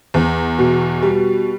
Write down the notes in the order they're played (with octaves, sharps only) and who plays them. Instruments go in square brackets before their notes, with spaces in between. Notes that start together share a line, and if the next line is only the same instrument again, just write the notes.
[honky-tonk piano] E2
B2
G3